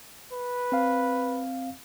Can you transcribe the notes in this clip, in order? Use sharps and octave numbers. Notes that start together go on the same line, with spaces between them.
B4
C4 F5